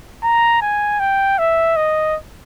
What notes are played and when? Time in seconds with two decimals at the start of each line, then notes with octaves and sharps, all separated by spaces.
0.23 A#5
0.62 G#5
1.00 G5
1.38 E5
1.76 D#5